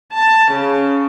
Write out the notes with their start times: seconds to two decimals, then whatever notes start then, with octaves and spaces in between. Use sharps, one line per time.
0.14 A5
0.53 C#3